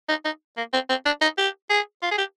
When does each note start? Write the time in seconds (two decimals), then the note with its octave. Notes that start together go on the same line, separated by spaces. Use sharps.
0.09 D#4
0.25 D#4
0.57 A#3
0.73 C4
0.89 C4
1.06 D4
1.22 D#4
1.38 G4
1.70 G#4
2.02 F4
2.11 G#4
2.18 G4